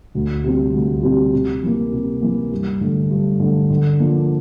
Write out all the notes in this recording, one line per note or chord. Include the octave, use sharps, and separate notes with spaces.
D2
C3 G3 C4
D2
C3 G3 C4
C3
E3 A#3
C3
E3 A#3
G2
D3 A3
G2
D3 A3
D3
F3 A#3 D4